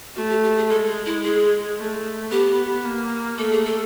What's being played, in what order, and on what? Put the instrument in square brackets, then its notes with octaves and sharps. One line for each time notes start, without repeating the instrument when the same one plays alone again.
[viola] A3 [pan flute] F#4
[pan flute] G4
G4
G#4
[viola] G#3 [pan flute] A4
[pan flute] G#4
E4
G#4
[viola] A3
[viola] B3 [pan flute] G4
[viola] A#3
[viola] A3 [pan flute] A4
[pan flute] G#4
A4